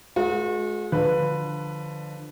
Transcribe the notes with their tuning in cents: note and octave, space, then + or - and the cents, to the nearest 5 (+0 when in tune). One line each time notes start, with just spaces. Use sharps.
G#3 +35 F#4 -35 B4 -25
D3 +20 F3 +0 B4 +0